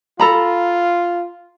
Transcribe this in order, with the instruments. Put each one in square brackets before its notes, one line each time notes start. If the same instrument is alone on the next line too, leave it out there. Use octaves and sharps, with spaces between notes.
[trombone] F4 [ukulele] A4 A#5 B5